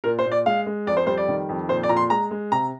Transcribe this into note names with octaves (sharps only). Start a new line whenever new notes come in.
A#2 A#4
C5
A#2
D5
G#3 F5
G#3
F2 D5
C5
G3 C5
D5
D#3
F2
A#2 C5
D5
A#2 A#5
C6
G#3 A#5
G#3
C3 A#5